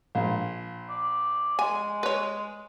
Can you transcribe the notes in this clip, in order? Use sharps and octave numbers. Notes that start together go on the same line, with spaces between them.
A#1
D5
G#3 G#5
B4 C#5